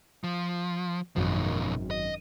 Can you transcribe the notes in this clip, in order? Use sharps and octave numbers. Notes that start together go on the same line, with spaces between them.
F3
G#1 F#2 B2 D#3 F3
D#5